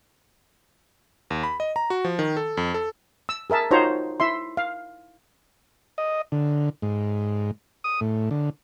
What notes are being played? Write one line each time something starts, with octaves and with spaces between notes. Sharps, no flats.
D#2
B5
D#5
A#5
F#4
F3
D#3
A4
F2
A4
E6
G#4 A#4 E5 A5
D#4 F4 F#4 C5 C#5 A#5
E4 E5 C6
F5
D#5
D3
G#2
D#6
A2
D3